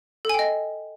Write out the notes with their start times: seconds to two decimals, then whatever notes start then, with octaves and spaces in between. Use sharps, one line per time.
0.25 A4
0.29 G#5
0.34 G5
0.39 D#5